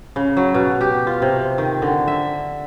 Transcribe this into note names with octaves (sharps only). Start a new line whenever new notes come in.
C#3
F#3
B2
G4
F4
C3
D#3
D3
E5